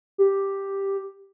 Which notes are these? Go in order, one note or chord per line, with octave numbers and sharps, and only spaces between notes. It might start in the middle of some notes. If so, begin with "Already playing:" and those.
G4